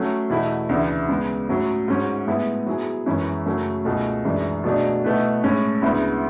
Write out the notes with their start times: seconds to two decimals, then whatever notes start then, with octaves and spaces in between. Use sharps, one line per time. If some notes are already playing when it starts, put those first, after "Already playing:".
Already playing: F#3 A3 C#4
0.30 E2 B2 A3 E4
0.69 D2 C#3 E3
1.08 C#3 G#3 B3
1.49 A2 F#3 C#4
1.88 G#2 F#3 C#4 F#4
2.27 A2 G#3 B3 E4 G#4
2.66 F#3 B3 E4 G#4
3.06 F#2 E3 G#3 C#4 E4
3.46 F#2 C#3 F#3 A3 C#4
3.85 C#2 B2 A3
4.25 F#2 E3 G#3 D4
4.64 B2 F#3 A3 D4 G#4
5.04 B2 A3 E4 B4
5.43 A2 G#3 C#4
5.82 D2 C#3 G#3 B3 E4